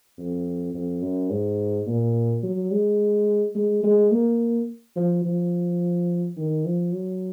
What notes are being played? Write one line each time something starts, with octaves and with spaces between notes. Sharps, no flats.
F2
F2
F#2
G#2
A#2
F#3
G#3
G#3
G#3
A#3
F3
F3
D#3
F3
F#3